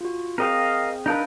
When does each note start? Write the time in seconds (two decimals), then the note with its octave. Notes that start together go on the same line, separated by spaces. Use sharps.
0.01 F4 F#4
0.38 C4 G#4 A#4 D#5 F5 G5
1.06 D4 D#4 A#4 B4 F5 A5